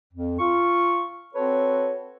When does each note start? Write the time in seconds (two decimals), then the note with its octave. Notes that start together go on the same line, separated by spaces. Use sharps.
0.14 F2
0.39 F4 C#6
1.34 C4 F#4 A4 B4 C#5